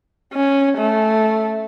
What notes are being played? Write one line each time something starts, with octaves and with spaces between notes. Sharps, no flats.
C#4
A3